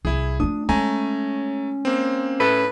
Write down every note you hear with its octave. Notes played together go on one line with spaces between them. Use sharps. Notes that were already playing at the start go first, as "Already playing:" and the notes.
C2 E4 G#4
A3 D4 F4 D#6
G#3 A3 C#4 G#5 A#5
A#3 C4
A2 E4 A4 B4